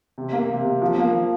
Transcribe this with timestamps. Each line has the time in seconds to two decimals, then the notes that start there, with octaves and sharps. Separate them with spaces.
0.18 C3
0.33 A#3
0.49 C3
0.65 C3
0.81 F3
0.98 A#3
1.13 F3